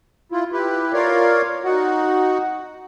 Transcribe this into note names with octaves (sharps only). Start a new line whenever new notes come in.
E4 F4
E4 G4 B4
F4 A#4 C#5 D5 F5
D#4 F#4 F#5